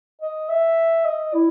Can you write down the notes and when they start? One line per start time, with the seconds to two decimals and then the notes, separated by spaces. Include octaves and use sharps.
0.22 D#5
0.49 E5
1.05 D#5
1.34 E4